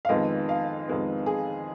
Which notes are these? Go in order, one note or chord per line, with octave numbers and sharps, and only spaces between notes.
F5
F2 D#3 G#3 B3 D#5
F5
F2 D#3 G#3 B3
G#4